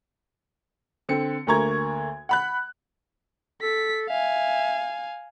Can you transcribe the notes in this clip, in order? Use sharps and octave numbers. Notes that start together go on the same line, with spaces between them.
D3 C4 C#7
D2 D3 A#3 A#5 C#6 G#6
F#5 B5 F#6
A4 B6
E5 F5 G#5